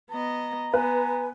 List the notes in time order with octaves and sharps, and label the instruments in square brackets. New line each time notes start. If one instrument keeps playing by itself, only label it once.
[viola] B3 D#5 [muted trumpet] A#5
[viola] B3 [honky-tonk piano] B4 [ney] G#5